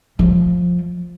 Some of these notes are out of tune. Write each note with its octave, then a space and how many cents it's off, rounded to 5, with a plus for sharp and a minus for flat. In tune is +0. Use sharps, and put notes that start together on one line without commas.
F3 +15